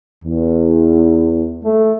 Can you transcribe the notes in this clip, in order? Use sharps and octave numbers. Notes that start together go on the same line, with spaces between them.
E2
A3